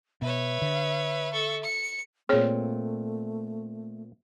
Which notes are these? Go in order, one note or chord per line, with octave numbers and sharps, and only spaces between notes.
B2 B4 C#5 E5
D3
A4 C#6
C#7
A#2 A3 C4 G#4 C#5